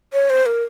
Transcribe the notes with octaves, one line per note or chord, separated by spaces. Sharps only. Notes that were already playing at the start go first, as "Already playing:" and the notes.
C#5
C5
A#4